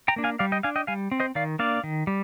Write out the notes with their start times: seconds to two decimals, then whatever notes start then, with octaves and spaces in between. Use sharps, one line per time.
0.08 G5 A#5
0.16 A#3 D4
0.24 F5 G#5
0.39 G3 D5 F5
0.52 D#5 G5
0.63 D4 F5 G#5
0.76 D#5 G5
0.87 G3 F5 G#5
1.11 C4
1.20 C5 D#5
1.35 D#3 D5 F5
1.59 A#3 D4 D5 F5
1.84 D#3
2.07 G3